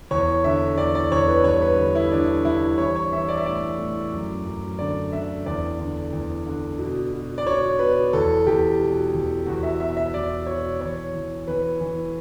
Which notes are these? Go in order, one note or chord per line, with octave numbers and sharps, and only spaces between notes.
E2 C#5
D3 E5
E2 D5
D5
E2 C#5
B4
G2 C#5
B4
D3
E4
D3 D4
G2 E4
E3 C#5
C#5
E3 E5
D5
E5
A2 D5
A2
F#2
F#2
D3 D5
D3 E5
E2 D5
D3
E2
D3
B2
B2
D5
B2 C#5
B2 B4
E2 A4
E2 G4
B2
E2
E2 F#4
E5
B2 E5
E5
E2 D5
B2 C#5
E3 C#5
E3
E3 B4
E3